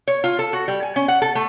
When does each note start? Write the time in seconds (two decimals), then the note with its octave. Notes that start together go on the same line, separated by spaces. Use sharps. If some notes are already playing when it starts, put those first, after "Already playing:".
0.08 C#5
0.24 F4
0.39 A4
0.53 F#4
0.68 G3
0.83 G#5
0.96 C#4
1.08 F#5
1.22 A4
1.35 A3